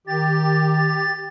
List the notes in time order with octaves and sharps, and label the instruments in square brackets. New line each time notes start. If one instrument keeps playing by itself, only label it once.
[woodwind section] D#3 [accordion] G4 [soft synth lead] A6